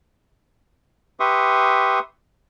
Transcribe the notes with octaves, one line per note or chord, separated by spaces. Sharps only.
G4 B4 E5 C6 C#6 D#6